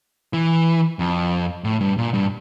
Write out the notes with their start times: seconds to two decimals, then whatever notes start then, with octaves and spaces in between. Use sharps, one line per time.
0.33 E3
0.99 F2
1.64 A2
1.81 G2
1.98 A#2
2.14 G2